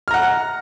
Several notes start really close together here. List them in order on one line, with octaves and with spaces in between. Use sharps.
F6 A#5 F#5